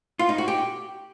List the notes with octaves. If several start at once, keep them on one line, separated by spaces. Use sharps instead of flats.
F4
D#4
F#4
G4